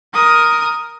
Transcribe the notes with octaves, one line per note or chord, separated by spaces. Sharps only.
A#4 D#6